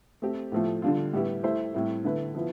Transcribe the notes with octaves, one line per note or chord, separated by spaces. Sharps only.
A3 C4 G4
A2 F3 A3
D3 G3 D4 F4
A2 G3 B3 E4 G4
A3 E4 G4 C5
A2 G3 C4 E4
D3 A3 E4 B4
F3 B3 E4